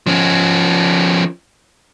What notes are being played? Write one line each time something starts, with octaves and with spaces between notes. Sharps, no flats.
F3 C#4